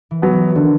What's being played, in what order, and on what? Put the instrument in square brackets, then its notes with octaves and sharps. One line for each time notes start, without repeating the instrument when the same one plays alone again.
[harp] E3
[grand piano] F#3 B3
[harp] E3
[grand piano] D3 [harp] D#3